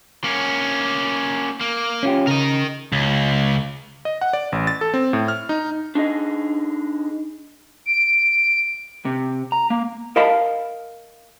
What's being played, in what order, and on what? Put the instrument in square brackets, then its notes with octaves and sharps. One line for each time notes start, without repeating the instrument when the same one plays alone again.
[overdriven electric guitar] A#3 C#4
A#3
[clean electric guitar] C#4 F4 G4
[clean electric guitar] C#3 [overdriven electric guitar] A#4 D#5
[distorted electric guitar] C#2
[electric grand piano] D#5
F#5
D5
A1
A6
A4
C4
A2
F6
D#4
[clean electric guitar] D4 D#4 G#4 D#5
[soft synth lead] D7
[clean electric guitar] C3
A#5
A#3
[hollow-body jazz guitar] A#4 D#5 F5 A5 B5